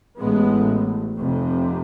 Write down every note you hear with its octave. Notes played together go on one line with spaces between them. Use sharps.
A1 A2 G#3 B3
F1 F2 C3